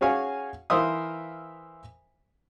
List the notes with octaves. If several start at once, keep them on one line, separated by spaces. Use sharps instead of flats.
C#4 F#4 G#4 C#5 F5 G#5
E3 A#4 C5 E5 F5 D#6